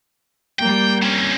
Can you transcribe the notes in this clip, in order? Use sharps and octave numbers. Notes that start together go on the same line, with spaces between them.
G3 A#3 G5
C4 C#4